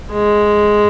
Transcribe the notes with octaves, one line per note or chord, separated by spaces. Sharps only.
G#3